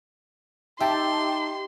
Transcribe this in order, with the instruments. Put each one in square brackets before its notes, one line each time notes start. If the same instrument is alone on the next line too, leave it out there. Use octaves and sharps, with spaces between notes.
[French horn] D#4 [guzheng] G4 [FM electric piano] E5 G5 A5 [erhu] C6